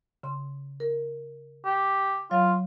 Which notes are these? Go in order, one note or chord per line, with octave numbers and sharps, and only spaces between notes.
C#3 C6
A#4
G4
F#3 F4 C#5 F5